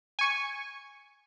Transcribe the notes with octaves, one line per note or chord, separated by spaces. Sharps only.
G#5 C#6